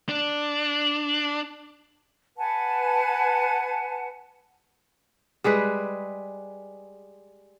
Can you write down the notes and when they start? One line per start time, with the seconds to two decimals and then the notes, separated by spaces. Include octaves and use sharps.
0.09 D4
2.37 B4 F#5 G#5 A5
5.44 G3 G#3 G#4 B4